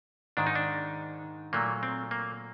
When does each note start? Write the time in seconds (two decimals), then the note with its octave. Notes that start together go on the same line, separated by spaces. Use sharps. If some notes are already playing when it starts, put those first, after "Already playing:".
0.37 G#2 D#3 G#3 D4
0.47 D#4
0.55 D4
1.53 A#2 F#3 A3 A#3
1.83 C4
2.11 A#3